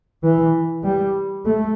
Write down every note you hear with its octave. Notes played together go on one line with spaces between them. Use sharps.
E3
G3
A3